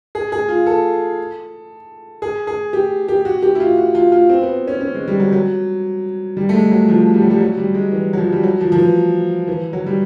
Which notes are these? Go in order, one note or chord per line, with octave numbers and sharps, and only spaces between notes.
G#4
G#4
F4
A4
G#4
G#4
G4
G4
F#4
G4
E4
F4
F#4
F4
F4
C4
B3
C#4
C#4
G#3
G3
F#3
F#3
G3
A3
G#3
F#3
F3
G3
F#3
G3
F#3
G3
G#3
E3
F#3
F3
G3
F#3
F3
F3
E3
E3
F#3
G3